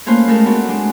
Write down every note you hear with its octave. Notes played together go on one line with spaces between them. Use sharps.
A3 A#3 C#4 F4 B4 C5
G#3 A3 A4 A#4
B3 C4 F#4
G#3 D4